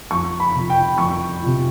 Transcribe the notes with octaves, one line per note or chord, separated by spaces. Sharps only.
F2 C#6
B5
C3 F3
G5
F2 C#6
C3 F3